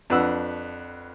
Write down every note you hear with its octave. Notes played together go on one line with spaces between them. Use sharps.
F2 D4 B4 F#5 E6